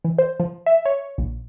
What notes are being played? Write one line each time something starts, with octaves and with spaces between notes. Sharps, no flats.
E3
C5
F3
E5
C#5
A#1